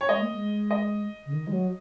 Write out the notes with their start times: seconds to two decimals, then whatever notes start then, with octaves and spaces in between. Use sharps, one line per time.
0.01 C#5
0.09 G#3 D#5
0.21 A#3
0.33 G#3
0.71 D#5
1.26 C#3
1.33 D#3
1.48 G#3
1.52 F#3